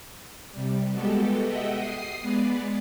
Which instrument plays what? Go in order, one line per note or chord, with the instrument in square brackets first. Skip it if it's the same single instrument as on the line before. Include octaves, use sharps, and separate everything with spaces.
[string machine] C3 G3
G#3 B3 F#4 G4 A4
D#5 E5 F#5 G5
D#6 C7
G#3 B3 B4 D5